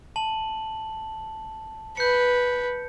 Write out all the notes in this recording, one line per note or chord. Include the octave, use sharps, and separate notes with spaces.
A5 F#7
B4 G6 C#7